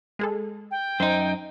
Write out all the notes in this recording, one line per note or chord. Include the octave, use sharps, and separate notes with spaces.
G#3 G#4 A4
G5
F#2 D#4 C5